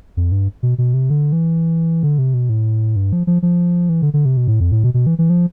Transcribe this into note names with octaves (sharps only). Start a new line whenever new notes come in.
F2
G2
B2
B2
C3
D3
E3
D3
C3
B2
A2
G2
F3
F3
F3
E3
D3
D3
C3
B2
A2
F2
A2
B2
B2
E3
E3
F3